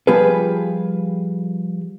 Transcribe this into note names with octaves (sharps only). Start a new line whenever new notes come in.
F3 G3 F4 G#4 B4